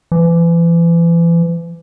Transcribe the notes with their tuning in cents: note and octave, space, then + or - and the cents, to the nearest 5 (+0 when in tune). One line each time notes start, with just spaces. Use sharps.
E3 +35